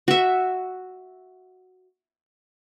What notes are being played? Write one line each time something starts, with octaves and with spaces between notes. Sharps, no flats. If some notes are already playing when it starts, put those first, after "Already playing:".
F#4 E5